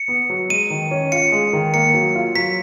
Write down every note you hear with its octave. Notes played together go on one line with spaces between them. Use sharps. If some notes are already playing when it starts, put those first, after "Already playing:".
Already playing: C#7
B3
F#3
G#3 D#7
D#3
C#4
F4 C#7
G#3
D#3
A#3 C#7
F#3
F4
F#3 B6